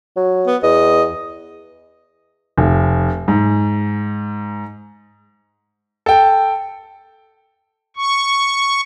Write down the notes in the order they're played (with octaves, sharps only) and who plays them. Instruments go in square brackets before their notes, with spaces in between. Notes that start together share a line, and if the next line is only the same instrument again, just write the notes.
[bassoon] F#3
[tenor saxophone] B3
[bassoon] E2 [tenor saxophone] D#5
[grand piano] F1
G#2
A4 G5
[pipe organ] C#6